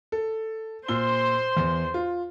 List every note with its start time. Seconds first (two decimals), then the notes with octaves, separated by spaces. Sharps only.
0.12 A4
0.88 A#2 C5 C6 E6 G7
1.57 E2
1.94 F4